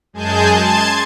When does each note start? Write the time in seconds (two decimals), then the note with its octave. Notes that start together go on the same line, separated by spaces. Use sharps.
0.13 F#2 G#3 G#4 G#5 A5 G6
0.53 A5 C6 G#6